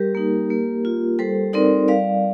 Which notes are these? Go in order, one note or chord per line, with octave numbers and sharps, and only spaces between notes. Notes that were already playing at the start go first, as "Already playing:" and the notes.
Already playing: G3 G4 A#4
A#3 D#4
A#3
F4
G3 A4 C5
C4 D#4 A#4 D5
G3 D5 F5